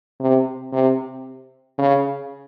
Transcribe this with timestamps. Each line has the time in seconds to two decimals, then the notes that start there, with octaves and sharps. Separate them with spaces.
0.20 C3
0.73 C3
1.78 C#3